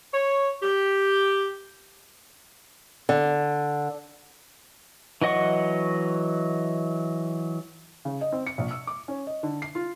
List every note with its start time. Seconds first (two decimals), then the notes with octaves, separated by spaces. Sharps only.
0.13 C#5
0.61 G4
3.09 D3
5.22 E3 F#3 D#5 F#5 C#6
8.05 C#3
8.21 D#5
8.32 C4
8.46 C#7
8.58 A#1
8.71 E6
8.87 D6
9.08 C#4
9.27 D#5
9.43 D3
9.62 C7
9.75 F4